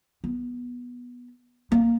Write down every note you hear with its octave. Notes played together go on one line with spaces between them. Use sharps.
B3
A#3